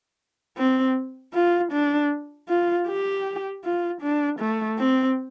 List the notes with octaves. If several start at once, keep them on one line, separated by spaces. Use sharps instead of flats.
C4
F4
D4
F4
G4
F4
D4
A3
C4